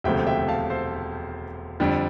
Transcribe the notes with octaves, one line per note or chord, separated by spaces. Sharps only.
E1 D2 C3 F3 A3 E5 G5
E5 G5
F5 A5
A4 C5
F2 D3 G3